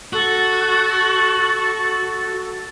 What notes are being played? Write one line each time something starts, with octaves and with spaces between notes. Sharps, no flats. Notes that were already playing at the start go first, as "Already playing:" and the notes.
F#4 A4